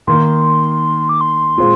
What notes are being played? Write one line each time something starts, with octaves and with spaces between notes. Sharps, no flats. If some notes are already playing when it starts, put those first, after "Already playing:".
D#3 A#3 D#4 C6
D6
C6
A#2 G#3 C4 F4